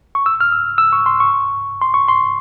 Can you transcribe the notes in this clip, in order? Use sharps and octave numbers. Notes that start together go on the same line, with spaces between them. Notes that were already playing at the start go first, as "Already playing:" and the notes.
C#6
E6
F6
E6
E6
C#6
C6
C#6
C6
C#6
C6